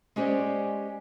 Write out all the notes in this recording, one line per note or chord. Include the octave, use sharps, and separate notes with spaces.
G#3 C#4 G4 C5 D5 D#5